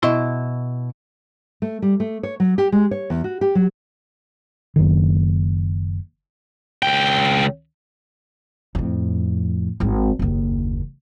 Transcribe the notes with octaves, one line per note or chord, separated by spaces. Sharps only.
B2 E4 C6
A3
G3
A3
C#5
F#3
G4
G#3
C#5
E2
F#4
G4
F#3
F#1 D#3
C#2 G5
F2 A2
G#1 G#3
F#1 D#2